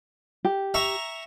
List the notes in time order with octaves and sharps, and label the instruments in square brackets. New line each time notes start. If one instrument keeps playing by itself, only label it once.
[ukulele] G4
[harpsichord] E5 A#5 C#6